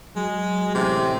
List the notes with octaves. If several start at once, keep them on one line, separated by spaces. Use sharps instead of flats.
F#3 G#3
A1 C3